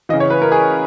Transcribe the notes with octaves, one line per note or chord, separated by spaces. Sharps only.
C#3 E3 D#5
C#5
B4
A#4
G#4